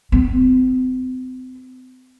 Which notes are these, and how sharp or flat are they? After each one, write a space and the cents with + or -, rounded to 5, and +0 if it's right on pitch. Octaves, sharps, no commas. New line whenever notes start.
C4 -35